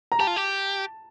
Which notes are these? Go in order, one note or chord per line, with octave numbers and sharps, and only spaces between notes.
A#5
G4 A5
F4
G4